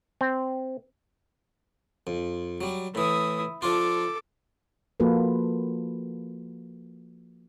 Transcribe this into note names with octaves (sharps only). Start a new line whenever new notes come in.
C4
F2
F#3 G3
A2 E3 E4 D#6
F3 D4 F4 A4 D6
F3 A#3 F4 F#4 A4 B4